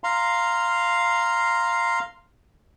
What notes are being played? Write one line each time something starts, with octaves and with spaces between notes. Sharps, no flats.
F5 A#5 C6